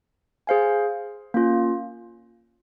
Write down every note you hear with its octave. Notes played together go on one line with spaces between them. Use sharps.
G#4 C5 F5 G#5
A#3 C#4 F4